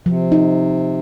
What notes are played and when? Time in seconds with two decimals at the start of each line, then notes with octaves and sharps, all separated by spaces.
0.06 C3 F3
0.32 D#4